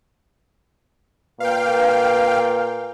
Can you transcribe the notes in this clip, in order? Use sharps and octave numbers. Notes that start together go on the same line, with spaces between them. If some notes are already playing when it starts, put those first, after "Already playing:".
A#2 B4 F5 G5